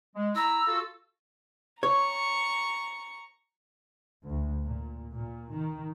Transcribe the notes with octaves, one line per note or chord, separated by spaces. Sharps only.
G#3
E4 A#5 E6
F4 F#4 A4
C#5 A#5 C#6
D2
A#2
A#2
D#3